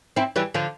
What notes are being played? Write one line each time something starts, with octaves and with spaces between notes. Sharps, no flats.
C4 E4
E3 G3
D3 F3